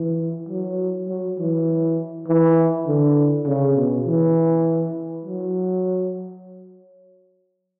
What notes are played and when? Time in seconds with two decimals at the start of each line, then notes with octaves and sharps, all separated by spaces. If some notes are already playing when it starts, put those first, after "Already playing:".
Already playing: E3
0.49 F#3
1.09 F#3
1.39 E3
2.28 E3
2.87 D3
3.47 C#3
3.77 B2
4.06 E3
5.25 F#3